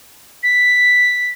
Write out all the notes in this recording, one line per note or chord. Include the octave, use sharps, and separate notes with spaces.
B6